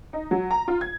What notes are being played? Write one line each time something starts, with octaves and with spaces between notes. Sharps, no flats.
D#4
F#3
A#5
F4
G#6